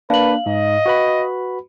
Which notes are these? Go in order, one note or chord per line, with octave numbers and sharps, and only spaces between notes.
A#3 D4 B4 F5 F#7
G#2 D#5
F#4 B4 B5